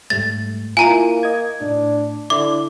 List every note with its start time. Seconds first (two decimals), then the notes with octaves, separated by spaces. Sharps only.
0.10 G#2 G3 A3 A6
0.77 A#3 E4 F4 G#5 A#5
1.23 D#5 G#6
1.61 A2 D4
2.30 D3 E4 D6